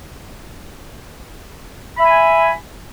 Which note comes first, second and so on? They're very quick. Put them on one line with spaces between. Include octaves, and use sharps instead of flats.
B5 E5 G#5